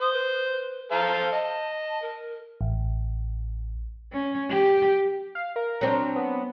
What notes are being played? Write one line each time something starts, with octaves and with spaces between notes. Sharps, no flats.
C5 D#6
B4
A4 C5 F5 A#5
D#5 A5
A#4
A1
C#4
G4
F5
A#4
F#3 C4 D4
B3